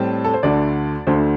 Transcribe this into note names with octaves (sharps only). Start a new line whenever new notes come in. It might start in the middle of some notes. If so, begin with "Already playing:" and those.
Already playing: A2 G3 C4 A5
A4
C5
D2 D3 A3 D4 D5
D2 D3 A3 D4 C5